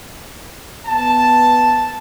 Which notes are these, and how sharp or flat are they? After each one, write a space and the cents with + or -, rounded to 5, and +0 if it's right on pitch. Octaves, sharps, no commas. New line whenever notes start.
B3 +0 A5 +0